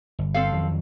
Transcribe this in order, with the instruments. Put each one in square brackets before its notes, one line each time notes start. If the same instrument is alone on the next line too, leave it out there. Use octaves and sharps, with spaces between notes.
[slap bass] G1
[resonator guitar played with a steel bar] C4 A4 F5
[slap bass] F2 D#3 F#3